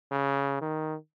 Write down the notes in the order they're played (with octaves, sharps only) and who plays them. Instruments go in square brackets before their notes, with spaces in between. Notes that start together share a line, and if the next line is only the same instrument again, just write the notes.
[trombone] C#3
D#3